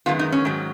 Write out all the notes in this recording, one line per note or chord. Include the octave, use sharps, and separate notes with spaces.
F#2 D#3 G#3 B3 F4
D#4
C#4
G#2 D#3 F#3